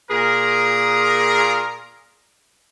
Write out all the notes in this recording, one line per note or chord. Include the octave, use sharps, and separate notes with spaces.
A#2 G#4 A#4